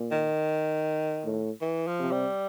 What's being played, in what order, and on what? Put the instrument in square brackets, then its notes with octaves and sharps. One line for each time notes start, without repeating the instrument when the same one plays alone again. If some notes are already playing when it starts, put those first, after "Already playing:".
Already playing: [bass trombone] A#2
[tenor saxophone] D#3
[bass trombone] A2
[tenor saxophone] E3
F3
[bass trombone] C3
[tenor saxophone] G3